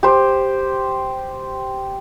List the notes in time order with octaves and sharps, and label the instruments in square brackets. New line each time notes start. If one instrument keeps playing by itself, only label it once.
[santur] G4 C5